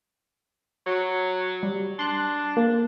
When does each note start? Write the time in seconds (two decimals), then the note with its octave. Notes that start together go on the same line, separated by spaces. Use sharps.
0.87 F#3
1.63 G3
1.99 D4 C6 F#6
2.57 A#3